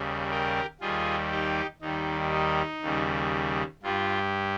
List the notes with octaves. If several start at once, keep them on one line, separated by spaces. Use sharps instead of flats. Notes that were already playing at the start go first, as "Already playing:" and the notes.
Already playing: D#2 C#3 G3
G4 A#4
D#2 D#3 G3 F4 G#4
D#4 G4
D#2 D#3 G3 D#4
D#4
D#2 C#3 G3
G2 G3 F4